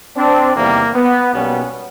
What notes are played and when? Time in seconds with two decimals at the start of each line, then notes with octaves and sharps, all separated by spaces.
0.16 C4 D4
0.55 E2 C3 D#3 G3 A#3
0.95 B3
1.33 B1 B2 G3 A#3 B3 C#4